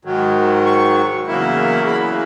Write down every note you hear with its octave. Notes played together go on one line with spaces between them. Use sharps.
G#2 D#3 F#3
C#6
E2 C#3 F#3 A#3 E4
B5